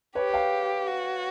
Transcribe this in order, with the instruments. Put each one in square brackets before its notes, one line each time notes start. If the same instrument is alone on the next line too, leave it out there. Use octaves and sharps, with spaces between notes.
[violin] G4 [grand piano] B4 C#5
[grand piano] F5 G5
[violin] F#4